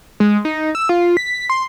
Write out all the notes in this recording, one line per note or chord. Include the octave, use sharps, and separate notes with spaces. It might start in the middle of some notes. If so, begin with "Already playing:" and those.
G#3
D#4
E6
F4
B6
C6